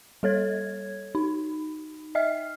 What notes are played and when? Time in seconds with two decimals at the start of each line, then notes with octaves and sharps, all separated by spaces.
0.23 G3 A4 C#5 G#6
1.15 D#4
2.15 D#5 E5 F6